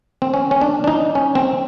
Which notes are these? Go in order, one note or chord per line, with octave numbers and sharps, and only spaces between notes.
C4
C#4
C#4
D4
D4
D#4
C#4
C4